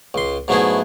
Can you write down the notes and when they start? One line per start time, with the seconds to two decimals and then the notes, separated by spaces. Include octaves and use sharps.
0.14 C#2 C6
0.48 G#2 F#3 A3 B3 E4 G#4